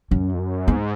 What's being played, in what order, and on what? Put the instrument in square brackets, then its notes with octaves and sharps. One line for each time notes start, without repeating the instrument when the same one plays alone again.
[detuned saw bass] F#2 [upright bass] C#4
[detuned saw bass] F2
F#2
[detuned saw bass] G#2 [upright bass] B3